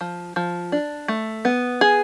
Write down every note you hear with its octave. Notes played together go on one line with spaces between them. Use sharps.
F3
F3
D4
A3
B3
G#4